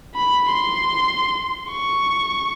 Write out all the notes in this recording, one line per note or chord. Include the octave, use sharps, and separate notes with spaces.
B5
C6
C#6